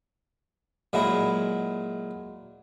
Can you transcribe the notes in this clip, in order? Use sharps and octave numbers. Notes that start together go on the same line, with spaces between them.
A#2 F#3 G#3 E4